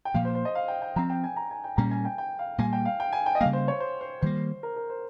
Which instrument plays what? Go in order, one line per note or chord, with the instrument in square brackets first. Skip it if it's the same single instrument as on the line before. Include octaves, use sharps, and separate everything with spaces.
[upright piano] G5
[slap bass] A#2 F3 A#3 [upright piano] F5
[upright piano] C5
C5
D#5
F5
G5
G5
[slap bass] F3 C4 [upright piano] A#5
[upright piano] G5
G#5
A#5
G#5
G5
[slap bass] A#2 G3 A#3 C#4 [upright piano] A#5
[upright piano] G#5
G5
G5
F5
[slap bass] A#2 G3 A#3 [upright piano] G#5
[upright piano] G5
F5
G5
G#5
G5
D#5
[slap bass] C#3 G3 A#3 [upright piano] F5
[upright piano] C5
C#5
C5
C5
[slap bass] D#3 G3 A#3 [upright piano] C5
[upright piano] A#4
A#4
C5